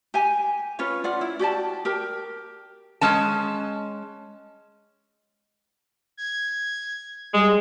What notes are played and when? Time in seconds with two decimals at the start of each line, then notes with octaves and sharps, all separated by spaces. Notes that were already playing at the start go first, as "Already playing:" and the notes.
0.14 G4 G#5
0.79 C#4 F4 B4 C#5
1.04 F4 D5 F#5
1.21 E4
1.39 F#4 G4 D5 A5
1.85 G4 A#4
3.01 G#3 C#4 A5
6.17 G#6
7.34 G3 G#3